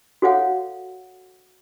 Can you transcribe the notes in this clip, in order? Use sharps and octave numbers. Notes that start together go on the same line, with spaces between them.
F#4 A4 C#5 F5 F#5